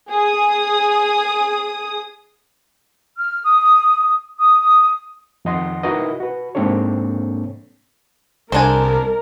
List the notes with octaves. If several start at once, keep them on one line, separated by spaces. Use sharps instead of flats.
G#4 D#6
F6
D#6
D#6
F2 D#3 D#5 F#5 C6
D#4 E4 F#4 A#4 B4 D#5
F#4 B4
G#2 A#3 C4 D4 A4 C#5
C2 G#3 D4 A#4 C5 G#5